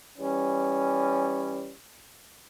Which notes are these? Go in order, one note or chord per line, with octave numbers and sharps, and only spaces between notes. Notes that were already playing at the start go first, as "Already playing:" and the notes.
E3 G3 C#4